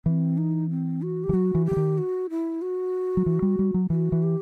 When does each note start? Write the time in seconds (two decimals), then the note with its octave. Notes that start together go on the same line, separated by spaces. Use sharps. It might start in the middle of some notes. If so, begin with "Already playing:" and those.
0.05 E3 C4
0.38 D#4
0.70 C4
1.02 F#4
1.24 G4
1.29 E3
1.33 F#3 F#4
1.55 E3
1.66 G4
1.71 E3
1.77 D#3
1.98 F#4
2.30 E4
2.62 F#4
3.17 F#3
3.26 E3
3.42 G3
3.59 G3
3.74 F#3
3.90 E3 F#4
4.12 E3
4.23 G4